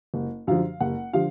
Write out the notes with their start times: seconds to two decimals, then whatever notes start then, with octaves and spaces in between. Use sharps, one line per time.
0.14 F#1
0.47 F#2 D3 F3 F5
0.80 F#1 F#5
1.13 D3 F3 F5